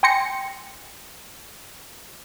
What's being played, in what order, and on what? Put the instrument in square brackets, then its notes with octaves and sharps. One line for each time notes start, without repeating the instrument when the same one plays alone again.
[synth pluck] G5 G#5 C6 A#6 C#7